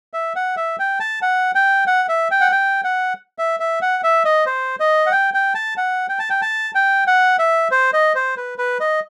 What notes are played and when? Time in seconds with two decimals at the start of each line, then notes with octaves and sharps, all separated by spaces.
0.13 E5
0.36 F#5
0.57 E5
0.79 G5
1.00 A5
1.22 F#5
1.55 G5
1.87 F#5
2.09 E5
2.31 G5
2.41 F#5
2.52 G5
2.84 F#5
3.39 E5
3.60 E5
3.82 F#5
4.03 E5
4.25 D#5
4.46 C5
4.80 D#5
5.06 F#5
5.12 G5
5.34 G5
5.55 A5
5.77 F#5
6.09 G5
6.19 A5
6.30 G5
6.42 A5
6.75 G5
7.07 F#5
7.39 E5
7.71 C5
7.93 D#5
8.15 C5
8.37 B4
8.58 B4
8.80 D#5